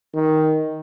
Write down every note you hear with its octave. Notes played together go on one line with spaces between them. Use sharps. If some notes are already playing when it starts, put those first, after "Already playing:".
D#3